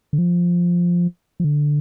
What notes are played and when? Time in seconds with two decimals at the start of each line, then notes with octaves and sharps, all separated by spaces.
0.13 D3
0.18 F3
1.40 F3
1.44 D3